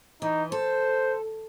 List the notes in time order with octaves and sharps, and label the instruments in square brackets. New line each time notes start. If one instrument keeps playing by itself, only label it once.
[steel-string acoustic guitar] E3 [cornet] D#4
[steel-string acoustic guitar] A4 [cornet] C5